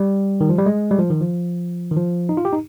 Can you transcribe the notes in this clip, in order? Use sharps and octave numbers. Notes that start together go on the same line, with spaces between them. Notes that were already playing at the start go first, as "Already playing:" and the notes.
Already playing: G3
D#3
F3
G3
G#3
G3
F3
D#3
F3
D#3
F3
D#4
F4
G4
D#4